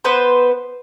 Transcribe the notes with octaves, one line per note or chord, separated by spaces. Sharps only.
B3 B4 C5